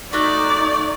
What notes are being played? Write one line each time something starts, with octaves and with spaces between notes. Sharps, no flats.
A3 D#4 F#4 D5